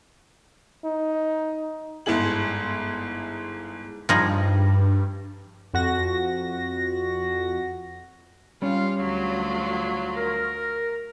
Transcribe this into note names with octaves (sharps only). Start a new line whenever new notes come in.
D#4
G1 G#2 E4 G#4 F#7
G2 F3 D#4 G#4
F2 F#4 A#6
G3 C#4 F4
D2 F#3 F4
A#4